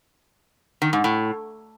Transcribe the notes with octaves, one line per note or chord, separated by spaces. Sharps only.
D#3
G#2
A2